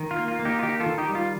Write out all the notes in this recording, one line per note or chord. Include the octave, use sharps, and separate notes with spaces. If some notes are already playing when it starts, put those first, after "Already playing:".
Already playing: D#3
F4
A#3
F4
A#3
D#4 G4
F4
D#3 D#4 G4
F4 A4
D#3
D#4 G4
G3
F4